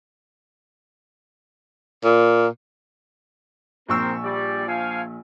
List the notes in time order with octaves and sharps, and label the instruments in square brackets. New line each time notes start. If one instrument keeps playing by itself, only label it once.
[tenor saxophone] A#2
[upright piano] A#1 C#6 E6 [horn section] C4 A#4 C5
[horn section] G3 D5
F3 F5 G#5